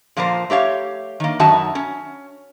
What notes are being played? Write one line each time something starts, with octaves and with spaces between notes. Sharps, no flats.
A#2 F3 A#3 A#4 C5
A3 G4 C#5 F5
D#3 A#3
F#2 D#3 D#4 F#4 E5 A5
C#4